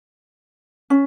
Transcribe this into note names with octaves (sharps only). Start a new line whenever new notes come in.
C#4